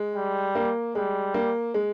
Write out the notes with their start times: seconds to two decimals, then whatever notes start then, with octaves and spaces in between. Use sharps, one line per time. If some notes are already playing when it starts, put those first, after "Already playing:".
Already playing: G#3
0.16 G3
0.55 A#3
0.95 G3 G#3
1.34 A#3
1.74 G#3